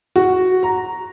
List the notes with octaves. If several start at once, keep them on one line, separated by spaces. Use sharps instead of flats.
F#4
A#5